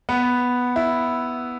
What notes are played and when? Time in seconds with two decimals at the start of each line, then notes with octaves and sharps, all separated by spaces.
0.09 B3
0.76 E4